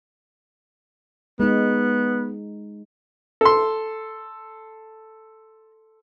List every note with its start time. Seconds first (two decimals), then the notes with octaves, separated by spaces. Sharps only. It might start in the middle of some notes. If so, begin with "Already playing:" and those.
1.40 G#3 B3 D#4
3.41 A4 C6